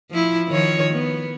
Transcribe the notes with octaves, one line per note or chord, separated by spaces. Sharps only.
F3 E4
D#3 F3 C#5
B3